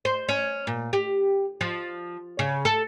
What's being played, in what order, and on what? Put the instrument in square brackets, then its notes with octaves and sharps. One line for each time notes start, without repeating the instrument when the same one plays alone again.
[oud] C5
C#4
A#2
G4
F3
C#3
A4